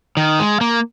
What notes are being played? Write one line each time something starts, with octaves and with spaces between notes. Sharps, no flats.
D#3
G#3
A#3